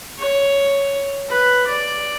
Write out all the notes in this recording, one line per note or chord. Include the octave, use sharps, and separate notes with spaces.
C#5
B4
D5